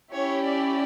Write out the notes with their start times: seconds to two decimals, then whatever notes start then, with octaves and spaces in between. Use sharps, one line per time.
0.13 C#4 E4 G4 C#5
0.47 D5